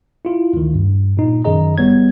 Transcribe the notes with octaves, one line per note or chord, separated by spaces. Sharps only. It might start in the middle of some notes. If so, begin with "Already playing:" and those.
E4 F4
D2 D#3
G2
A#2 D#4
F#2 D#3 G#4 D#5 A#5
G1 G3 B3 C#5 G#6